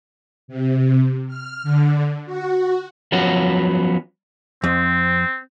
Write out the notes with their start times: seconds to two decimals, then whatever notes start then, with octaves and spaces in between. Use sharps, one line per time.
0.48 C3
1.28 F6
1.63 D3
2.26 F#4
3.12 F3 F#3 B3 C#4 F#4
4.64 F2 C4